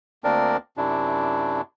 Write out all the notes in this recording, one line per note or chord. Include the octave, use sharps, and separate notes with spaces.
D2 A#3 C4 D4 A#4 D5
F#2 C3 D4 E4